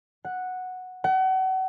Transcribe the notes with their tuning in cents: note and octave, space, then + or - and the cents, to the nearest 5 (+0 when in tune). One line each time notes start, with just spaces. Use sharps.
F#5 -5
F#5 +35